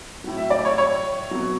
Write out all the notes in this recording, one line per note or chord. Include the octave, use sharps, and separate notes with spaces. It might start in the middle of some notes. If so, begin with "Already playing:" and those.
A2 F#3
E5
D5
C#5
C#5
B2 F#3